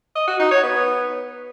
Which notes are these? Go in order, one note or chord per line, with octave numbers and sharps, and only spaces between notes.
D#5
F#4
D#4
C#5
B3